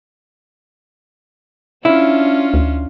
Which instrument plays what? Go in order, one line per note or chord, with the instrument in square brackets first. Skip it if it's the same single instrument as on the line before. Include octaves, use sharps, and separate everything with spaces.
[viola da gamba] C#4 D4 F4 [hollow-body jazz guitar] E4
[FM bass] D2